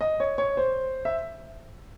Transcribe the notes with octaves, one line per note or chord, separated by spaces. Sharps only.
D#5
C#5
C#5
C5
E5